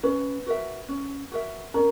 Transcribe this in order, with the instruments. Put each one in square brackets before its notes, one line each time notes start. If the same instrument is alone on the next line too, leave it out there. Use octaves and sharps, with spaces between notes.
[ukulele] C#4 [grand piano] B4
[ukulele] F#4 A#4 E5
C#4
F#4 A#4 E5
[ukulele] C#4 [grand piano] A#4